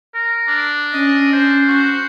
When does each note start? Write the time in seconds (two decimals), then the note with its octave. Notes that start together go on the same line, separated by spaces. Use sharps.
0.14 A#4
0.48 D4
0.94 C#4 D#5
1.33 C5
1.68 F#4